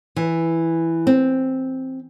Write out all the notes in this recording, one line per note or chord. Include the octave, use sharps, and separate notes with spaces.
E3
C4